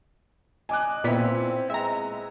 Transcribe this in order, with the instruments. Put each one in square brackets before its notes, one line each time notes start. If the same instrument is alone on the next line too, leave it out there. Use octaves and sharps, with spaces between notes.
[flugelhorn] D#5 [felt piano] G#5 D6 F#6
[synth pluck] A#2 B6 [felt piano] B3 E4 [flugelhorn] C4
[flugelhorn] G#3 [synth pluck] E5 A#5